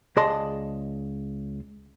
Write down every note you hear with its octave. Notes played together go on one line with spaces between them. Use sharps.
C#2 G#4 D5 D#5 A5 C6